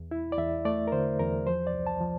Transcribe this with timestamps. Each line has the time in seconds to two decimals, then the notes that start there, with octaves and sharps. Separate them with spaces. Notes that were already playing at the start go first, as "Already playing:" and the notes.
Already playing: E2
0.11 E4
0.32 D5
0.38 E2 E5
0.65 A3 D5
0.87 A#4
0.92 D3 C5
1.19 E2 A#4
1.46 F3 C5
1.67 D5
1.73 C2
1.87 A5
2.01 F3